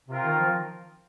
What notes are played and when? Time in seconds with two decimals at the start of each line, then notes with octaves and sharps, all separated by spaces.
0.08 C3 C4 F4 A#4
0.24 D#3
0.40 F3